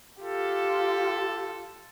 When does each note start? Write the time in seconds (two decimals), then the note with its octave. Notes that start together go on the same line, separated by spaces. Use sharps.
0.22 F4 G4 A4